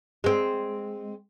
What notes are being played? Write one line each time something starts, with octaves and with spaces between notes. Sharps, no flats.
G#3 C4